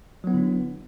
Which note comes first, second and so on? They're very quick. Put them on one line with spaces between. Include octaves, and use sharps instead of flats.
F#3 B3 E4 D3 D4